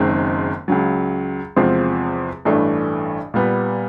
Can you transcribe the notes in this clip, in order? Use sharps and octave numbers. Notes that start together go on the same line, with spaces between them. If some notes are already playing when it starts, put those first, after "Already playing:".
Already playing: F#1 F#2 D#3 G#3 C4
C#2 C#3 F#3
E2 C3 F3 G#3 C4
A1 G2 E3 A3 D4
A#2 G3 B3